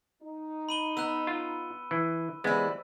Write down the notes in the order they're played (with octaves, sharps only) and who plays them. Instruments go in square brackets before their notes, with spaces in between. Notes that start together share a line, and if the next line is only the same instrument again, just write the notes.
[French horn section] D#4
[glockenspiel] B5 D#7 G7
[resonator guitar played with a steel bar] B3 [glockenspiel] E6 F#6
[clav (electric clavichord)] F4
E3
[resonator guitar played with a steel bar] E3 E4 [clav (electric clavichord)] G#3 B3 [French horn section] G4 C5 D5